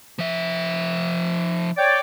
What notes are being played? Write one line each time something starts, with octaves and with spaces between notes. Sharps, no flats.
F3 E5
C#5 D5 G5